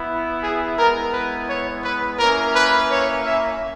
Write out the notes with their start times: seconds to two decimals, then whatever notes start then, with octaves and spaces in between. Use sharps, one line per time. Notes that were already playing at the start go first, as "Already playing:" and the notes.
Already playing: B3 E4
0.43 G#4
0.78 G#3 B3 E4 A#4
1.13 B4
1.50 C#5
1.85 B4
2.19 A#3 C#4 E4 A#4
2.55 B4
2.90 C#5
3.25 E5